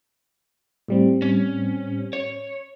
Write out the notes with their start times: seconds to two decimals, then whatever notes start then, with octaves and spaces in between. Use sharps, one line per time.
0.88 A2 G3 C4
1.22 C#4
2.13 C#5